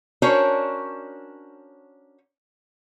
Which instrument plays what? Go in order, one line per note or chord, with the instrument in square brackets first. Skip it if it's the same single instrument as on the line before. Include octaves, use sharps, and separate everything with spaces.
[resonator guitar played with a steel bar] C#4 D4 F#4 A#4 C5 C#5